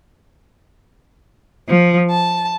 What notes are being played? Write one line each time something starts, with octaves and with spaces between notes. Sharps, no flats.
F3
A5